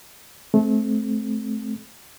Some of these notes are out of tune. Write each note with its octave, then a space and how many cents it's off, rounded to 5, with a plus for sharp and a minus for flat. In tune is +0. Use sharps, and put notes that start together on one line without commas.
A3 -25 C4 +0